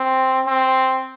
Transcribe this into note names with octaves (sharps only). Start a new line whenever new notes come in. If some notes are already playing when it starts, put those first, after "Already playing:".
Already playing: C4
C4